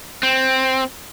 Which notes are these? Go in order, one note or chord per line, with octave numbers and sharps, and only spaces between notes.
C4